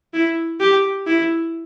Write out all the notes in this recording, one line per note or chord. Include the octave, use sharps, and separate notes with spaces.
E4
G4
E4